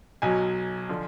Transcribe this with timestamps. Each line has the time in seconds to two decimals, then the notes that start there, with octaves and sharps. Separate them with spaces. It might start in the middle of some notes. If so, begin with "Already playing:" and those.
0.22 B1 B2 F#3 G#5
0.89 D3 F3